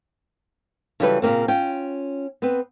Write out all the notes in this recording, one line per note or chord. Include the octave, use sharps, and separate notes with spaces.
C#3 E3 F#3 G3 A4 B4
A#2 C#3 E3 A#3 C4
C#4 F4 G5
B3 C4 B4